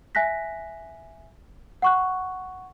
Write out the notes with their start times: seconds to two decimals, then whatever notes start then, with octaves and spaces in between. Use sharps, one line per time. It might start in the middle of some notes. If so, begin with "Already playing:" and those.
0.15 E5 G#5 F#6 A#6 B6
1.82 F#5 C#6 F#6